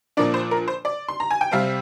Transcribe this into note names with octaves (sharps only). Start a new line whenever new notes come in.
A#2 F3 A#3 D4 D5
C5
A#4
C5
D5
C6
A#5
G#5
G5
C3 G3 C4 F5